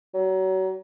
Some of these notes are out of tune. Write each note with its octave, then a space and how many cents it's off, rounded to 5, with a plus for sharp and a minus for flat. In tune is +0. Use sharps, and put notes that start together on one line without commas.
F#3 +30